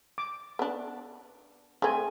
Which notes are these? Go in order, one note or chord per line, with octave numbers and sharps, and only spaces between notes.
D6
B3 D4
A3 C4 G#4 G#5